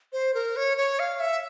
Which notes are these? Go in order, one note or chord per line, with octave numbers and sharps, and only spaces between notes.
C5
A#4
C#5
C#5
F5
E5